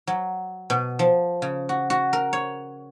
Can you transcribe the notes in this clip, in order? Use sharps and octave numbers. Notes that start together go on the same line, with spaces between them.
F#3
B2
F3
C#3
F#4
F#4
A#4
C#5